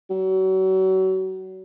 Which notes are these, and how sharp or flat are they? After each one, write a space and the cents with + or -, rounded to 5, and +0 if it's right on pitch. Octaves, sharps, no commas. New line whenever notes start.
F#3 +35